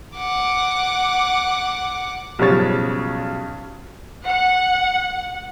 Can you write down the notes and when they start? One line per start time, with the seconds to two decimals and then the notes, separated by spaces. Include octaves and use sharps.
0.17 F#5 D6
2.39 B1 G2 C#3 F3 C#5 A6
4.24 F#5